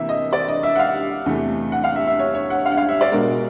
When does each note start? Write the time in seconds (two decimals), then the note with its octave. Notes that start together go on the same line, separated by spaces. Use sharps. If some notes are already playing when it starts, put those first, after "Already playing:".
Already playing: C3 E3 A#3 E5
0.09 D#5
0.33 D5
0.48 D#5
0.63 E5
0.75 F#5
0.79 F5
1.26 E2 C3 E3 A3
1.72 F#5
1.84 F5
1.96 E5
2.07 E5
2.19 C#5
2.34 C#5
2.50 F#5
2.66 F5
2.72 F#5
2.77 F5
2.89 E5
3.01 D5
3.12 B2 G#3 A#4